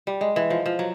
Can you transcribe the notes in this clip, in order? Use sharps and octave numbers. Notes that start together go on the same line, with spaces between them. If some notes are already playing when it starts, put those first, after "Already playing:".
G3
G#3
E3
F3
F3
F#3